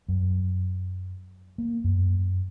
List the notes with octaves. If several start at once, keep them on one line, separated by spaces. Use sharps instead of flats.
F#2
A#3
F#2